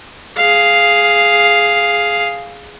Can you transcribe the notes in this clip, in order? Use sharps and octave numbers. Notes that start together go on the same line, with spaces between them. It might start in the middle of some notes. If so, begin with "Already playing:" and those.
G#4 F5